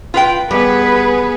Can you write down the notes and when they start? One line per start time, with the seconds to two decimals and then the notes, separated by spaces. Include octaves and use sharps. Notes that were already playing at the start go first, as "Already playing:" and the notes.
0.14 F4 B4 G5
0.51 G3 B3 G#4 B4